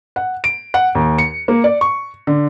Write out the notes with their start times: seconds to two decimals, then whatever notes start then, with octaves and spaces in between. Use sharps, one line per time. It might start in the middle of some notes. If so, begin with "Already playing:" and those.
0.16 F#5
0.44 D7
0.74 F#5
0.95 D#2
1.18 C#7
1.48 A#3
1.64 D5
1.81 C#6
2.27 D3